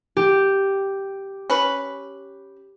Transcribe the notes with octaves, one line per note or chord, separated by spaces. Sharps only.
G4
C#4 B4